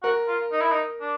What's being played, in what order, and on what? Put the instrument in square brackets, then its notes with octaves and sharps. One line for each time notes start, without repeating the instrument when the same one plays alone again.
[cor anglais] F#4 [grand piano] A#4
[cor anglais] F4
D#4
E4
D#4
D4